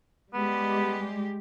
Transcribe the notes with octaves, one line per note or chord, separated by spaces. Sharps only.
G3 G#3 B3 G4